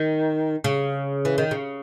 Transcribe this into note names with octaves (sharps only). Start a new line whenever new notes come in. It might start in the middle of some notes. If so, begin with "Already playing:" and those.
Already playing: D#3
C#3
E3
D#3
C#3